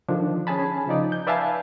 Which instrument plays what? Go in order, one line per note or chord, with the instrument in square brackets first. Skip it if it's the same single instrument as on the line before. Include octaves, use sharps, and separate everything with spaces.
[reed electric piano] D3 D#3 F3 D4
C#4 G#4 G#5 A5 B5
C#3 F3 D#4 D5
G6
B4 D5 E5 F5 G#5 A5